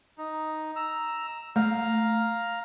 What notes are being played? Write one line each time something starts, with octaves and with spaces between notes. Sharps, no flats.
D#4
A#5 E6
A3 F5 A#5